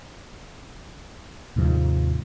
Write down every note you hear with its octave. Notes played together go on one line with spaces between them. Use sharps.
D#2 G#2 C3 F3